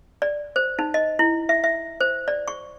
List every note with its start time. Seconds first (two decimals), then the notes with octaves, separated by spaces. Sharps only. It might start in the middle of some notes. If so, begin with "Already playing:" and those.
0.22 D5
0.56 C5
0.79 D#4
0.94 D#5
1.19 E4
1.49 E5
1.64 E5
2.00 C5
2.28 D5
2.48 C#6